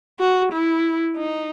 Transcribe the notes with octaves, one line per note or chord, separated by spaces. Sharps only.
F#4
E4
D#4